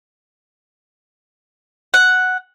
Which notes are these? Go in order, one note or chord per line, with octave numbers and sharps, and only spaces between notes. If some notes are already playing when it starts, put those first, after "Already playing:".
F#5